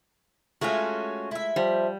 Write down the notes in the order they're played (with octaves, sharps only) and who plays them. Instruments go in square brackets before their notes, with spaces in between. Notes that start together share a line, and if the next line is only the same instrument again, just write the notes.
[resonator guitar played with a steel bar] G#3 A3 F4 [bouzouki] C#4 F#4
[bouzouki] E4 E5
[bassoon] F3 [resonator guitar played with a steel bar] G3